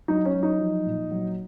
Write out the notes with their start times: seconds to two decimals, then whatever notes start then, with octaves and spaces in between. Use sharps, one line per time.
0.08 F#3 D#4
0.25 C#4
0.34 F#3
0.43 D#4
0.60 F3
0.85 A#2
1.11 F#3